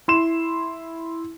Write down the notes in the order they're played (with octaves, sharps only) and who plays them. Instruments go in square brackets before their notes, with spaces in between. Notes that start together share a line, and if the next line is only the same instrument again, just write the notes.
[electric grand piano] E4 C6 E7